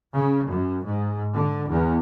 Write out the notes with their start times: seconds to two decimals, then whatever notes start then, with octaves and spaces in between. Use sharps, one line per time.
0.16 C#3
0.49 F#2
0.87 G#2
1.35 D3
1.69 E2